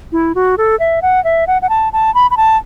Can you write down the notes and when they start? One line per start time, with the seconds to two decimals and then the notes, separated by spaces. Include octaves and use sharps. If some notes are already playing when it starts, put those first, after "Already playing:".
0.12 E4
0.35 F#4
0.58 A4
0.79 E5
1.02 F#5
1.24 E5
1.47 F#5
1.62 F#5
1.69 A5
1.93 A5
2.15 B5
2.31 B5
2.37 A5